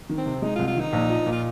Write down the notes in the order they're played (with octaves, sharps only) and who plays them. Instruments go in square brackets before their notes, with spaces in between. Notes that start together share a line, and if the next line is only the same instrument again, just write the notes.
[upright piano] D#3
[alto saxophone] C4
[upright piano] C3
[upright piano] G#3 [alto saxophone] D#4
[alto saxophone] F4
[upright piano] C2
[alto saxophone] F4
[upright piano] D#3 [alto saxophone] D#4
[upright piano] A#1
F3
A#2
[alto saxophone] F4